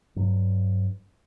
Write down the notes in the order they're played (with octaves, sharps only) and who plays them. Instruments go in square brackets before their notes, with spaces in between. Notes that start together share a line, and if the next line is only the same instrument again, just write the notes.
[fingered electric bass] G2 F#3